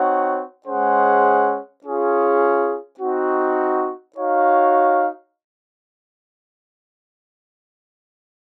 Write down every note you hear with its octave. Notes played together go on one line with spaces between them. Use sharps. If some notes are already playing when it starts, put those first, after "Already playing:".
Already playing: C4 D#4 F#4 C#5 F#5
G#3 C#4 G#4 C5 F#5
C#4 F4 G#4
C4 D#4 F#4
D#4 F#4 C#5 F5